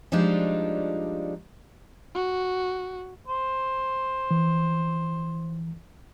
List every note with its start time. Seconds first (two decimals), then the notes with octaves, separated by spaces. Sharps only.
0.12 F3 G3 G#3 D4 D#4 F4
2.15 F#4
3.28 C5
4.31 E3